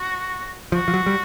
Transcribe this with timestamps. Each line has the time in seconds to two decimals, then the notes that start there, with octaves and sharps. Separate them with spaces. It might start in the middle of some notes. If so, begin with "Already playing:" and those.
Already playing: F#4
0.72 F3 F#4
0.88 F3
0.94 F#3
1.06 G3